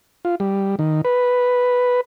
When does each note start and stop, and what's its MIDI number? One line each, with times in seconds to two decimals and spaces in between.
0.25 0.35 65
0.40 0.75 55
0.79 1.01 51
1.05 2.01 71